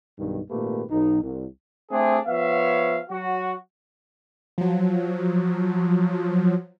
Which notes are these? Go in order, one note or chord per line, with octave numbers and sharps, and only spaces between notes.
B1 G2 D#3
G#1 A#2 A3 A#3 G4 B4
B1 D#4
C2
A3 C4 D4 G#4
F3 B3 C#5 E5 F5
F#3 F#4
F3 F#3